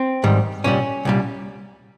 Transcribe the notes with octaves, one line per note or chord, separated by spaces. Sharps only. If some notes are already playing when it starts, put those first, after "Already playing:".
Already playing: C4
G#2 D#3 G3
C2 A#2 G3 C#4
C2 A#2 G3